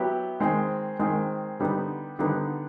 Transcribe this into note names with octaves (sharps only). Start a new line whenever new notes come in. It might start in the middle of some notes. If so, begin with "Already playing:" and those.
Already playing: F#3 B3 E4 G4
D#3 G#3 C4
D#3 G#3 C4
D3 G3 B3 D#4
D3 G3 B3 D#4